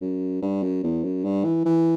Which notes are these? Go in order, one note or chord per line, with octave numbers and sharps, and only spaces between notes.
F#2
G2
F#2
E2
F#2
G2
E3
E3